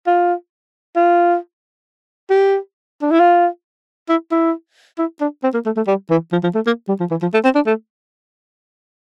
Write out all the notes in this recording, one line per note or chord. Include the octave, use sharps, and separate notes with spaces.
F4
F4
G4
D4
E4
F4
E4
E4
E4
D4
C4
A#3
A3
A3
G3
E3
F3
F3
A3
A#3
G3
F3
E3
F3
A3
C4
D4
A3